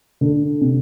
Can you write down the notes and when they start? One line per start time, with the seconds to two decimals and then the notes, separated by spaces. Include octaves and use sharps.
0.21 D3
0.61 C3